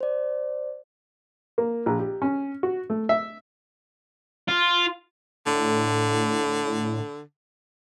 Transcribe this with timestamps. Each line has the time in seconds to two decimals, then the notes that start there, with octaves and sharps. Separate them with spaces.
0.01 C5 D5
1.58 A#3
1.86 A#1
1.99 G4
2.22 C#4
2.63 F#4
2.90 A3
3.09 E5
4.48 F4
5.46 A2 D3